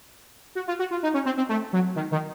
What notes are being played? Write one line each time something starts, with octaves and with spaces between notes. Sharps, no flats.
F#4
F4
F#4
F4
D#4
C#4
C4
C4
A3
F#3
D#3
D#3